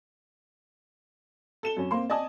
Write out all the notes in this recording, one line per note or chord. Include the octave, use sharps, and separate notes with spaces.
A4 E7 G7
F#2 C#4
A#3 C4 C6
D5 D#5 G#5 A5 D#6